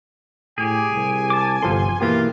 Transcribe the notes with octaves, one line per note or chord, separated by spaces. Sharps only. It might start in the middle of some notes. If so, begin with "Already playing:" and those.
A2 G4 G#4 G#5
C2
A5 D6
G1 C3 F3 A4 C6
B1 E3 A#3 F4 G4